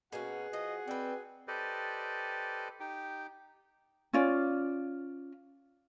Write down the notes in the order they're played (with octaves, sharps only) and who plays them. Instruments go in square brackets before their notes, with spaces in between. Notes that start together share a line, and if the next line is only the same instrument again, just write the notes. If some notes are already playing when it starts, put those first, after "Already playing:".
[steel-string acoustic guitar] B2 A#3 C#4 [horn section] F#4 G#4 F#5
[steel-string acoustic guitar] F3 [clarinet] D#5
[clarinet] C4 [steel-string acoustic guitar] B4 D5
[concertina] G4 A4 B4 C5 D5 D#5
D#4 G4 G5
[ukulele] C#4 F4 D5